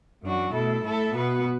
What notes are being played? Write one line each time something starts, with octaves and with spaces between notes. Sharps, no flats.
F#2 E3 D4 F#4
B2 A3 E4 A4
A2 A3 E4 A4 E5
B2 B3 F#4 B4